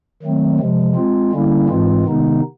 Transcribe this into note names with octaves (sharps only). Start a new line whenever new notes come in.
D#3 F#3 A3 C4
C3 F3 G#3
G#3 C4 F4
D3 G3 A#3 C#4 E4
G#2 E3 G#3 C4 F4
C3 D#3 G#3 B3 D#4